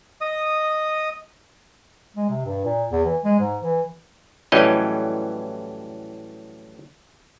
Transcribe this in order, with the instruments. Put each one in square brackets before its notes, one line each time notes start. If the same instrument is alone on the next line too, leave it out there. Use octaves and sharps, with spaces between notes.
[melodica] D#5 D#6
[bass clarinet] G#3
C3
G2
A#2
E2
E3
G#3
G#2
E3
[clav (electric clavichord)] A2 E3 F#3 G3 C#4 D#5